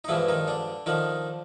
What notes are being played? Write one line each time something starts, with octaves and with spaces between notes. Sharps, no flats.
D#4
G2 D3 E3 F3 G#3 E4
D#3 D#4
D3 D4
D3 D#3 F3 D#4